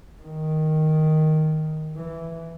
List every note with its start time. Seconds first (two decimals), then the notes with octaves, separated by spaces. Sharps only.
0.21 D#3
1.96 E3